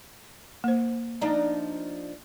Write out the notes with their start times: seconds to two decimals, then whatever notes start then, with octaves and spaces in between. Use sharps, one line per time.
0.64 A#3 C5
1.21 F3 D4 D#4